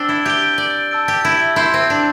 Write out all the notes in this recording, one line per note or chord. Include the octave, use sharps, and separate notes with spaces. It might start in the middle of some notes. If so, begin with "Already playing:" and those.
Already playing: C4 D4 E6 A6 G7
E4
G4 G6 D7 G7
D5
A5 E6 A6 D7
G4
E4
E4 C6 G6 C7
C4
D4